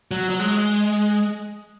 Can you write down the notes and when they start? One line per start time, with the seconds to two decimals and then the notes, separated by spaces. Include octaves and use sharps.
0.11 F#3
0.30 F#3
0.39 G#3